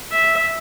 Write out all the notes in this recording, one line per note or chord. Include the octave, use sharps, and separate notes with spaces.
E5